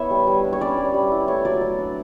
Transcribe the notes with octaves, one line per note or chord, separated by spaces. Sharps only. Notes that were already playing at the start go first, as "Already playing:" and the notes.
Already playing: B3 E4 B4 C#5 E5
G3
G3
D4
C#5
C#4 D5
G3
G3
E4
A3 C#5
F#3 D5
F#3
D4